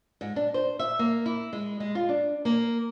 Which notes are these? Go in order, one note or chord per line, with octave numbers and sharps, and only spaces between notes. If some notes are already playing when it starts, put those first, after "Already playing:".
G#2
D4
C5
E5
A#3
E4
G#3
G#3
F4
D4
A#3